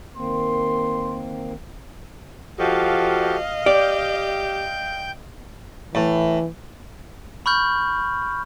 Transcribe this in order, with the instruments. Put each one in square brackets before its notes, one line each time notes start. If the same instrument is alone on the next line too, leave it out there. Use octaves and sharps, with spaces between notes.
[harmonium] D#3 A#3 C4 [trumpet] C6
[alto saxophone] F3 [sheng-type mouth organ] F#4 G4 A4 [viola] D#5 F5
[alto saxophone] G4 [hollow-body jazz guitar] D5 [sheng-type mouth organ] G5 G6
[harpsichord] A2 [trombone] E3
[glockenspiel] B5 C#6 F6 G6